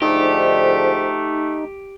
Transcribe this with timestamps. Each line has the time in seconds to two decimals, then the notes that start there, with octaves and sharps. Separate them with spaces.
0.02 G#2 D3 F3 A3 D#4 G4